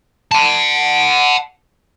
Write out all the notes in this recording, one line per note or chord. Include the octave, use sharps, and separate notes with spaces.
F#5 A5